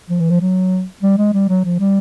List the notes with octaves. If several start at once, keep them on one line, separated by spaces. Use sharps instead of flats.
F3
E3
F3
F#3
G3
G#3
G3
F#3
F3
G3